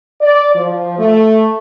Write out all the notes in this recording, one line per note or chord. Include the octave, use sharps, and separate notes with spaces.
D5
F3
A3